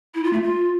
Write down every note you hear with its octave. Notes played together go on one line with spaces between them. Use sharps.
E4
F4
A3
F4